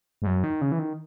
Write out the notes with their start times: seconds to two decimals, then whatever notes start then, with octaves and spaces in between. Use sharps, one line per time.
0.22 G#2
0.26 F#2
0.44 D#3
0.61 C#3
0.72 E3
0.79 D#3